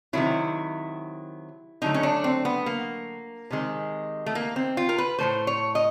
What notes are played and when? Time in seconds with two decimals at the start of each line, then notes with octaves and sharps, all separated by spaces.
0.13 C3 D#3 F#3 E4
1.82 D3 F#3 A3 D#4
1.94 C#4
2.03 D4
2.24 C4
2.45 B3
2.66 A#3
3.51 C3 D#3 G#3
4.26 A3
4.35 A#3
4.56 C4
4.77 F4
4.89 A#4
4.98 B4
5.19 A2 F#3 A3 C5
5.47 C#5
5.75 D#5